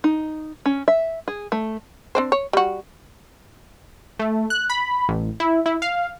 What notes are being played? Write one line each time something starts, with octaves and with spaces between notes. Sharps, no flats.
D#4
C#4
E5
G#4
A3
C4 D4 C5
C#5
G3 F#4
A3
F#6
B5
A1
E4
E4
F5